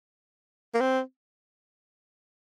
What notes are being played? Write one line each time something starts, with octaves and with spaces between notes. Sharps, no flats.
A#3
C4